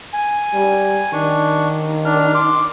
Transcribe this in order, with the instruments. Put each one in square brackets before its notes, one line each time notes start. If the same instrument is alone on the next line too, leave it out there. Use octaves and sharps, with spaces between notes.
[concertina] G#5
[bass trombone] G3
[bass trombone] D#3 [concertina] D4 C#6
[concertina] D4 F6
C6 D6